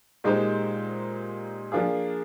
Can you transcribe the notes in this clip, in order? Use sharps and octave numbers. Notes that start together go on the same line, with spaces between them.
A#2 G#3 D#4 G4 C5
F3 A#3 D4 F4 G#4